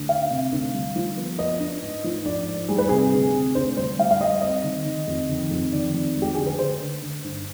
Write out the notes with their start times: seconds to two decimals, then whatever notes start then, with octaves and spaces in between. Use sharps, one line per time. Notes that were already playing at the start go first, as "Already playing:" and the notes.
Already playing: D2
0.09 D4 F5
0.31 C3
0.52 D2
0.74 G3
0.96 F3
1.18 B3
1.38 B3 D#5
1.60 D4
1.82 G#2
2.04 F3
2.26 D4 D5
2.47 G#2
2.69 G3 G#4
2.78 B4
2.89 C3 G#4
3.12 D2
3.34 C3
3.55 D2 C5
3.77 G3 C5
3.99 G3 F5
4.11 F5
4.20 G3 D#5
4.42 C4 D#5
4.64 D#3
4.85 D#3
5.08 F2
5.29 D#3
5.51 F2
5.72 D#3 D5
5.94 F2
6.16 G#3
6.22 G4
6.35 D3 G#4
6.47 B4
6.59 D3 C5
6.81 D3
7.02 D3
7.24 G2